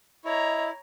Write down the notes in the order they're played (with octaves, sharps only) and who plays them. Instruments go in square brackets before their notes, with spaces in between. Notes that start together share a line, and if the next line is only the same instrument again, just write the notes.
[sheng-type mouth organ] E4 [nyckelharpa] C#5 A#5 [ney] D#5